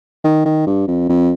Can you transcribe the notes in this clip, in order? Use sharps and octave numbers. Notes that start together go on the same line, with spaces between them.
D#3
D#3
G2
F2
F2